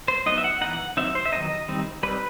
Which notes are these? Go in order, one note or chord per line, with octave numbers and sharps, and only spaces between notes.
C5
F#3 B3 D#4 D#5
E5
F#5
E3 B3 D#4 F#5
F#3 C4 D#4 E5
C5
E5
D#3 F#3 B3 D#4 D#5
D#3 G3 C4 D#4
G3 C4 D#4 B4